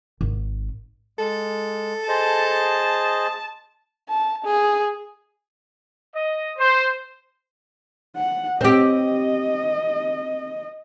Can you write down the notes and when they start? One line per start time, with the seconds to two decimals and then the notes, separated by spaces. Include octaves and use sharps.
0.21 G#1
1.19 G#3 A4
2.08 G#4 C5 D#5 A5
4.09 A5
4.44 G#4
6.15 D#5
6.58 C5
8.16 F#5
8.61 C4 G4 D#5